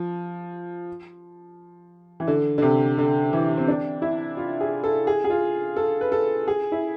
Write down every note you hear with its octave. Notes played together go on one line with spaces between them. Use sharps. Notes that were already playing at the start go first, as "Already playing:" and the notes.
Already playing: F3
E3
D3
D3
C3
D3
E3
C4
D4
E4
F4
G#4
A4
G#4
G#4
F4
A4
B4
A4
G#4
E4